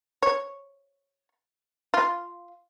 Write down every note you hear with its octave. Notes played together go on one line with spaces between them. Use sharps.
C#5
F4